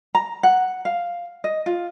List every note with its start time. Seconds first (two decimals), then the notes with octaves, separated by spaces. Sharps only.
0.15 A#5
0.43 F#5
0.85 F5
1.44 D#5
1.66 F4